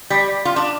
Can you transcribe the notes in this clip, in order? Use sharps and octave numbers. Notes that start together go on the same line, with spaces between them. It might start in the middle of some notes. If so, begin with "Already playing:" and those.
G3
F4
D4